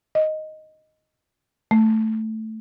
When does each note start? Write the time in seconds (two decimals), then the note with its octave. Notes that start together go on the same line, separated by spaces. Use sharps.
0.15 D#5
1.71 A3